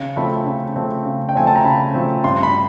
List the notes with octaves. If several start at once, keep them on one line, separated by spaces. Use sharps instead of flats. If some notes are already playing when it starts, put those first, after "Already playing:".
Already playing: C#3
F3 A3 C4 B5
C#3
F3 A3 C4
C#3
G5
F3 A3 C4 G#5
A5
A#5
C#3 B5
F3 A3 C4
G2 C6
B5